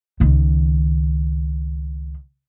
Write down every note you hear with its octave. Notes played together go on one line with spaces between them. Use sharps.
C#2 D#3